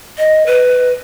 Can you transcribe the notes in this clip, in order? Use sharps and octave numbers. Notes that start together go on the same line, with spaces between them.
D#5
B4